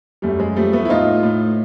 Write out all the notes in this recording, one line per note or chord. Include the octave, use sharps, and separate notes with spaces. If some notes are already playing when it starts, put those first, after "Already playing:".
F#2 G3 A3
G#3
F3 G3 A3
A3 B3
E4
A2 D#4 F4
A2